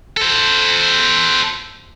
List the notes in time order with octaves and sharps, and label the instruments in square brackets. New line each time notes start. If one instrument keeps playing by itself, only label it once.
[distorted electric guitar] A4 C5